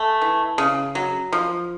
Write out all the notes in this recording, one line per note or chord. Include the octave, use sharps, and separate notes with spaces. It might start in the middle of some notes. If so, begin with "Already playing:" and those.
Already playing: A3 G#5
E3
C#3
F#3
F3